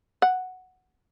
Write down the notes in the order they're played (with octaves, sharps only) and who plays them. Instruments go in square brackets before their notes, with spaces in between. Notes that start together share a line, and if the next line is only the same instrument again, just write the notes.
[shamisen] F#5